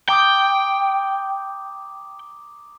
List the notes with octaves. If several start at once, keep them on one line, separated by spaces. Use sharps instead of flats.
G5 A#5 D6 D#6